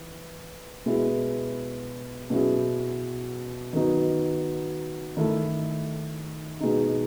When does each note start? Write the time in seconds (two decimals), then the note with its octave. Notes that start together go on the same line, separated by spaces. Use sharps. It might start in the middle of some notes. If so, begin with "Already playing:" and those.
Already playing: E3
0.86 B2 G#3 B3 E4
2.30 B2 F#3 C#4 E4 G#4
3.73 D#3 F#3 B3 D#4
5.17 D#3 A3 E4 A4
6.60 B2 G#3 D#4